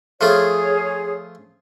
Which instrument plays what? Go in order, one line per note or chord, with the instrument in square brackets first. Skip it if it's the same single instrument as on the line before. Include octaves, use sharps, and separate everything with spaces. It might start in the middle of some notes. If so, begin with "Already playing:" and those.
[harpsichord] F3 A3 F4 [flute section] G#4 C#5